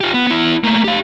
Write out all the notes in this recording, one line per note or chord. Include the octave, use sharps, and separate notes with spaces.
F4 G4
B3
B3 E4
A3 A#3
G4 F5